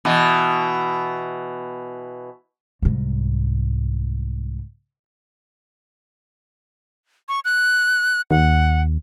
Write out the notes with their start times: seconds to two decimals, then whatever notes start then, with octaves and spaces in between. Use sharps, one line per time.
0.05 B2 E3
2.82 C2 G#2
7.29 C#6
7.45 F#6
8.31 D#2 F#5